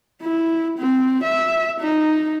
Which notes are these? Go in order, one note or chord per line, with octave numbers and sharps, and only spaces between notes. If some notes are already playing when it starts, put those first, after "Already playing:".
E4
C4
E5
D#4